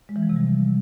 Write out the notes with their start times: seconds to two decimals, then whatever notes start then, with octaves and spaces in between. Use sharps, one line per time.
0.09 G#3
0.16 E3
0.23 F3
0.29 C3
0.36 G3